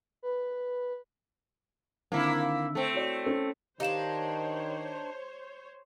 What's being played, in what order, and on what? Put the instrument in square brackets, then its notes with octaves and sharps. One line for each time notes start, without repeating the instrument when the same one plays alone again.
[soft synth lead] B4
[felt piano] D3 D#3 C4 [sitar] A#3 E4
[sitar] A3 C4
[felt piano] F#4 C#5 D5
C#4 A4 C5
[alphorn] D#3 [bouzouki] D4 D#4 [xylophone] G4 F5 E7 [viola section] C5 C#5